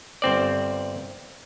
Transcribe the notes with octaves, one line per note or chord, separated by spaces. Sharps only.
G1 C4 D5